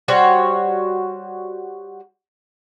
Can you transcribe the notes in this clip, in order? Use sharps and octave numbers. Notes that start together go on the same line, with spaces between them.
G3 F#4 C5 C#5